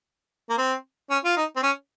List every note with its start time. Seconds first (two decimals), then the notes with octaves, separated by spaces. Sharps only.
0.49 A#3
0.58 C4
1.10 C#4
1.24 F4
1.36 D#4
1.56 C4
1.63 C#4